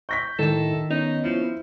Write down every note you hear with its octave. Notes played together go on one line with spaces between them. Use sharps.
C#6 G6 A#6 B6
A2 D#3 E4 A4 E7
B3 C#4 D#4
F3 E4